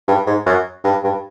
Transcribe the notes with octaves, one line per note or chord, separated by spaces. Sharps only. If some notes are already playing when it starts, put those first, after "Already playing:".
G2
G#2
F#2
G2
G2